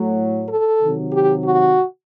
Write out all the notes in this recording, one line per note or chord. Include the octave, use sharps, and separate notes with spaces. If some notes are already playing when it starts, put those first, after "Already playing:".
Already playing: A2 F#3
A4
C3 D#3 F#3
G4
F#4